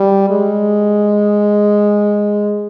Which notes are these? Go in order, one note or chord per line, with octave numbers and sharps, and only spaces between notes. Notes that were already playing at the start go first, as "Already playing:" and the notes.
Already playing: G3
G#3